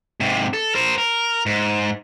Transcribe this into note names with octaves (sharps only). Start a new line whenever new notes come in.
G#2 C3
A4
A#4 C5
A#4
G#2